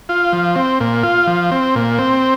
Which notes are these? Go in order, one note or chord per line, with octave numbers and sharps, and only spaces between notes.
F4
F3
C4
A#2
F4
F3
C4
A#2
C4